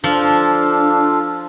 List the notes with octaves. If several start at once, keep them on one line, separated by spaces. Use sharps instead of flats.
F3 D4 F4 A4 F5